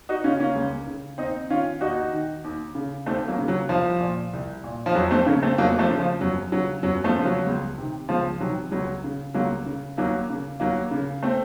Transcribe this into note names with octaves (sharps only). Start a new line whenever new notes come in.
D#4 F#4
C#3 C#4 F4
A#3 C#4
C#2
C#3
D#2 C4 D#4
D#3 C#4 F4
D#2 D#4 F#4
D#3
D#2
C#3
D#2 A3 C4
F#3 A#3
C#3
F#3
C2 F3
A#2
C2
A#2
F3
F2 F#3
A3 C4
C#3 A#3 C#4
A3 C4
F2 F#3 A#3
F3 A3
C#3
F3
F#2 F#3
C#3 F#3
F#2 F#3
F3 A3
C#3 F3
F#3
C#2
C3 D#3
C#2 F3
C3 D#3 F#3
C#2 F#3
C#3
C#2 F#3 A#3
C#3
D#2 F#3 A#3
C#3
D#2 F#3 A#3
C#3
A3 C4